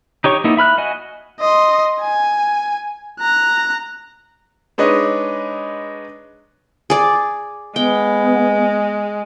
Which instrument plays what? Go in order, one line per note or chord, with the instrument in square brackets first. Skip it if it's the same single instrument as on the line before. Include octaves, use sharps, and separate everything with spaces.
[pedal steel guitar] D#4 G4 C#5 C#6
A#3 B3 D#4 E4
E5 B5 F6 F#6
F#4 D#5 G#5
[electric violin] D#5 C6
G#5
A#5 F#6
[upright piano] G#3 D4 D#4 B4 C#5 D#5
[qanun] G#4 D5
[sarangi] G#3 [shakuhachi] B3 [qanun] G5